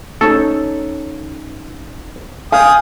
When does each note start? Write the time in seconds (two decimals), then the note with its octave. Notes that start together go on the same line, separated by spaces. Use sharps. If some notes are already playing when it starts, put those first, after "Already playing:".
0.21 C#4 D#4 A4 C#5
2.52 F5 G5 G#5 D#6 F6